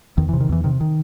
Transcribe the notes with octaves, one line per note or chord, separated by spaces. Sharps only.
E2 D#3
C3 E3
D#3
E2 E3
C3 D#3
D#3